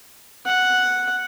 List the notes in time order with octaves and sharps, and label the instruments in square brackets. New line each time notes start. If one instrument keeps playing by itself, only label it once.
[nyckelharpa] F#5